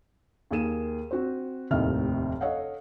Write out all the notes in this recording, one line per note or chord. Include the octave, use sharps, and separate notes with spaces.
D#2 A#3 G#4 D#7 E7
C4 F#4 C5
F1 D#2 A2 C3 D#5 F6
A4 C#5 D#5 F5 F#5